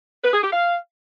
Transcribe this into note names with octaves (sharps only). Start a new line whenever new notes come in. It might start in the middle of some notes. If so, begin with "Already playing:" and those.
B4
G#4
G4
F5